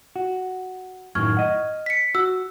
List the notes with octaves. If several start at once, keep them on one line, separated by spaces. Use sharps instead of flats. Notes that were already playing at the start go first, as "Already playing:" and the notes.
F#4
F#2 A2 D#3 C#6 F6 G#6
D#5 F#5
B6 C#7
F#4 E6